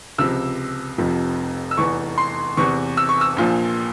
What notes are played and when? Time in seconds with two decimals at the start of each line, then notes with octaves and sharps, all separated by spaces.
0.18 C#2 C3 F3 E6
0.98 F1 F2 C3 F3
1.71 E6
1.77 F1 E2 E3 C#6
2.18 C6
2.57 E2 C3 E3 C#6
2.97 E6
3.09 C#6
3.21 E6
3.36 A#1 A#2 F3